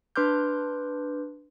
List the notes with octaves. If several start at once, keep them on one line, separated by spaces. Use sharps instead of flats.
D4 B4 C6 D6 F6 G6